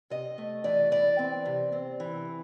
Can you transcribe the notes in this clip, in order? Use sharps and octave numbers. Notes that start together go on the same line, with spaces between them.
C3 D#5
A3
E3 D5
E3 D5
C4
C3
C4
E3